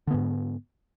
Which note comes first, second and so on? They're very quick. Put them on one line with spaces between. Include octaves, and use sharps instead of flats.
D3 B3 G#2